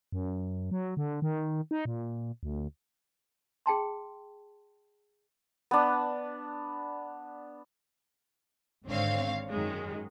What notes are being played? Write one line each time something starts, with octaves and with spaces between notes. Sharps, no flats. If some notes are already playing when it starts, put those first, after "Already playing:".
F#2
F#3
D3
D#3
D#4
A#2
D2
G#4 G5 A5 C6
B3 D4
G#1 G#2 D3 C4 C#5 F5
F#2 D#3 G#3